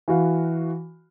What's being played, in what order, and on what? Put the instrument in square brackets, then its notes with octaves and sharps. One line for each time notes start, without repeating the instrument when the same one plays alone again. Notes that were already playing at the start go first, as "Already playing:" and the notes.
[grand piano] E3 F#4 F5